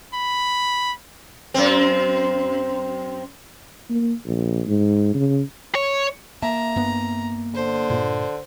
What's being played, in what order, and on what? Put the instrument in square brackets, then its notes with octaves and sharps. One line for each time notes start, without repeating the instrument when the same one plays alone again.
[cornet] B5
[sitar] F#2 C4
[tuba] A#3
A#1
G#2
C#3
[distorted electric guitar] C#5
[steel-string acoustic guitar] A#3 E5 A5 [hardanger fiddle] A#5
[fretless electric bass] G2 B3
[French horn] D3 [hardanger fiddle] C5
[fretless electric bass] G2 A#2